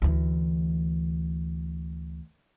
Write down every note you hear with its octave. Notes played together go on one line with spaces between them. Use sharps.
D2 E3